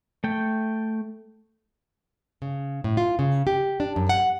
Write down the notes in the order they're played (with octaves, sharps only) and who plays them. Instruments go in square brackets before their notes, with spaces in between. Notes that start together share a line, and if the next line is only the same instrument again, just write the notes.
[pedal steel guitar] A3 G5
[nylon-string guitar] C#3
A2
F4
C#3
G4
D4
F#2
F#5